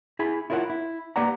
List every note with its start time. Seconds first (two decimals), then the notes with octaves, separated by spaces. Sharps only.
0.19 E4 G#4 B5
0.50 E4 F4 A#4 C#5 D#5 F#5
0.70 E4
1.16 A#3 G4 B4 D5 F#5 A#5